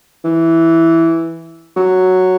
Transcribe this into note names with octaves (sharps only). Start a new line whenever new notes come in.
E3
F#3